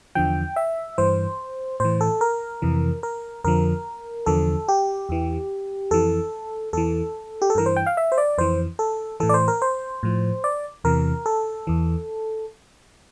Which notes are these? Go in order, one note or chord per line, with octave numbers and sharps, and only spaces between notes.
E2 D3 F3 G5
E5
G2 E3 C5
A2 E3 C5
A4
A#4
F2 C3 E3
A#4
F2 D3 F3 A#4
E2 D3 F3 A4
G4
E2 E3
F2 E3 A4
E2 E3 A4
G4
A4
G2 E3 A#4
C5
G5
F5
E5
C5
D5
F2 E3 C5
A4
A2 E3 A4
D5
C5
A#4
C5
A2 F3
D5
E2 C3 E3 A#4
A4
E2 E3